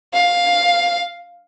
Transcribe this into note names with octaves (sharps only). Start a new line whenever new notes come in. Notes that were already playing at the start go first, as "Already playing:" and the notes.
F5